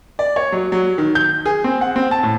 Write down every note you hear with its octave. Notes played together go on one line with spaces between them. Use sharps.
D5
C#5
F#3
F#3
D#3
G6
G#4
C4
F#5
C4
A5
A2